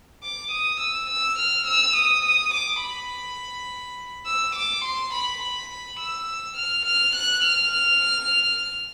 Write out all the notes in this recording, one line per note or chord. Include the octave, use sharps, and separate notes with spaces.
D6
D#6
E6
E6
F6
E6
D#6
D#6
D6
B5
E6
D6
C6
B5
B5
E6
F6
F6
F#6
F6